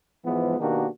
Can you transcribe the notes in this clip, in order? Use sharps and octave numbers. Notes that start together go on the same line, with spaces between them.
G#2 E3 F3 G#3 B3
B2 D#3 A#3 D4 F#4 G4